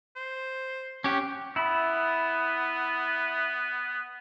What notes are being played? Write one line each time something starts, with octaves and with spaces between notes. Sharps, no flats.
C5
C#4 G4 F#5
B3 E4 B5